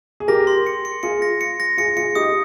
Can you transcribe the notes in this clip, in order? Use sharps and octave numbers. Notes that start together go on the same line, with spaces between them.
G#4
G4 A#4 A#6
C6
C#7
C#7
F4 G#4 C#7
A#6
C#7
A#6
F4 G#4 C#7
F4 G#4 C#7
D#4 G4 D#6